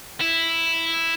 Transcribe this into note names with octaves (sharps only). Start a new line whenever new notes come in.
E4